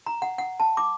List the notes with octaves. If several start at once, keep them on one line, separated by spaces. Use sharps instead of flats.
A#5
F#5
F#5
A5
D6